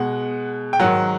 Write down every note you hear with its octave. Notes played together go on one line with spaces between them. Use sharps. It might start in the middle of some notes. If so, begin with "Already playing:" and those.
Already playing: B2 G#3 F#5
G5
G#2 D#3 F#3 F#5